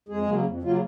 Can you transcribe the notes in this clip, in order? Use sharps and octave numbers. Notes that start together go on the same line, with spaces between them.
F2 G#3 G#4
C#3 F#3 A#3
F2
C#3 F#3 A#3 F4